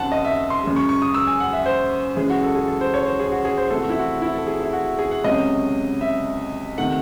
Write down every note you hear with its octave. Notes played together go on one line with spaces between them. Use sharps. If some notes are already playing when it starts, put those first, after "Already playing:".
Already playing: D#2 C#3 F#3 C4 F#5 A5
D#5
E5
C6
F#2 C#3 G#3
C#6
C#6
D#6
E6
G#5
F#5
E5
C5
F#2 C#3 E3 G#3 G#4
F#4
A4
G#4
A4
C5
C#5
C5
G#4
F#4
G#4
C5
C3 E3 A3 C4 A4
F#4
E4
F#4
E4
A4
G#4
E4
F#4
G#4
F#5
C#2 C3 F#3 C#4 D#5
E5
C3 D#3 A3 F#5